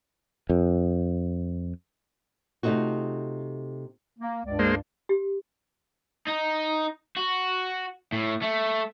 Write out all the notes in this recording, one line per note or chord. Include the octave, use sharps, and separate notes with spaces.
F2
C3 A3 D#4 F4 F#4
A#3
C#2 G2 D5
G#3 A#3 C5
G4
D#4
F#4
A2
A3